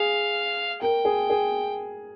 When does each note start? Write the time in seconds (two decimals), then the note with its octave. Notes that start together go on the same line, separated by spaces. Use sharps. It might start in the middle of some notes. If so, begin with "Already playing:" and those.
Already playing: G#4 F5
0.81 A#4 G5
1.05 G#4
1.30 G#4